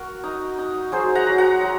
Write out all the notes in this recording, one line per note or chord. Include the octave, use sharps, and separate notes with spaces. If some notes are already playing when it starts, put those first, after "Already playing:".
Already playing: F#4 A#4
D#4
D#4
F#3 G#4 C5
F#5 A#5
F#3
F#5 A#5
F#3